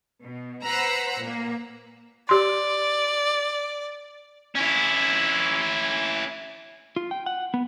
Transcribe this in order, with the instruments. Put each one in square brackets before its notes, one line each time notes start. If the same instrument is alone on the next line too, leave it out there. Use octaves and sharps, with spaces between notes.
[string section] B2
B4 C5 F#5 A#5 E6 F#6
A#2 A#3
[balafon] G4 C6 [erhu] D5
[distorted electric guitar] C#4 E4
[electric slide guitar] F4
G5
F#5
B3